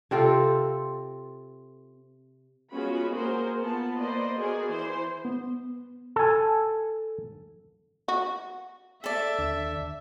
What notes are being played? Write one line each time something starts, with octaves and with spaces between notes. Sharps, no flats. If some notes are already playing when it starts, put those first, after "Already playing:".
C3 C4 F4 A4
G#3 B3 C#4 F4 F#4 B5
A#3 F#4 G#4 A#4 C5
B3 F4 A5
A#3 B4 C5 D5 D#5
B3 F#4 G#4 A#4 D5 G#5
E3 C5
B3
A4 G#5
F#4
A4 D5 E5
D#2 D3